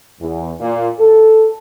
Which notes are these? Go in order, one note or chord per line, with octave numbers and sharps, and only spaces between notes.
E2
A#2
A4